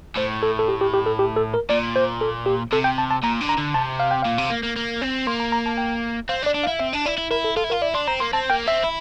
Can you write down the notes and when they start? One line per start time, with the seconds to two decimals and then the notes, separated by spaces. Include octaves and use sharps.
0.16 A2 C5
0.43 A4
0.59 A4
0.68 G4
0.81 G4
0.94 G4
1.06 A4
1.19 G4
1.36 A4
1.54 A#4
1.69 A#2 D5
1.96 C5
2.21 A4
2.46 G4
2.72 C3 A4
2.84 G5
2.98 A5
3.11 A5
3.23 A#2 A#5
3.41 D3
3.49 A#5
3.57 D3
3.74 C3 A5
4.00 F5
4.11 G5
4.23 A#2 F5
4.38 C3
4.50 A#3
4.63 A#3
4.76 A#3
5.01 C4
5.27 A#3 C6
5.40 A#5
5.52 A#5
5.66 A5
5.78 G5
6.29 C4 F5
6.42 D4
6.46 D5
6.54 D4
6.64 F5
6.67 E4
6.80 C4 E5
6.93 D4
7.06 E4 D5
7.18 E4
7.31 E4 A#4
7.44 A4
7.57 F4 A4
7.64 E4
7.70 F4 A#4
7.82 E4 D5
7.94 D4 C6
8.08 C4 A#5
8.20 A#3 C6
8.33 C4 A5
8.50 A#3 G5
8.67 C4 E5
8.84 E4